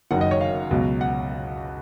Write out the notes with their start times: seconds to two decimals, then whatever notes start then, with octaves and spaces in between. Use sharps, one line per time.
0.11 F#1 F#2 D#3 F#3 F#5
0.21 D#5
0.31 C#5
0.41 F5
0.71 C#2 B2 F#3
1.01 F#5